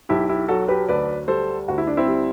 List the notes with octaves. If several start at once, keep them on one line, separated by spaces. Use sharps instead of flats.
B1 E4 G4
E4 G4
F#3 F#4 A4
G4 B4
D2 B4 D5
G3 A4 C5
D2 F#4
E4
D4
C4 E4
G3